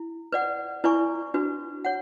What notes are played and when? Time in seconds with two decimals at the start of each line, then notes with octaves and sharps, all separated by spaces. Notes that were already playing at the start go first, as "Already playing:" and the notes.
Already playing: E4
0.33 B4 D5 F#5
0.84 E4 B4 D5 G#5 C#6
1.34 D4 F#4 B4
1.85 C#5 F#5